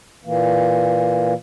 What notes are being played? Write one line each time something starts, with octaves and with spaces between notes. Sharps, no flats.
A#2 E3 A#3